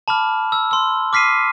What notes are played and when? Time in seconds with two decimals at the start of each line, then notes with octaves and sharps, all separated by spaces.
0.08 A5 B5 D6 F6
0.52 E6
0.71 C6 E6
1.13 D6 F6 B6 C7 D#7